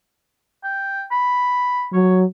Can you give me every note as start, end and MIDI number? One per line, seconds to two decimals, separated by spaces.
0.64 1.04 79
1.11 1.87 83
1.93 2.25 54
1.93 2.19 73